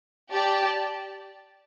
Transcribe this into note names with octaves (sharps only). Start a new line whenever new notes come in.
G4 D5 A5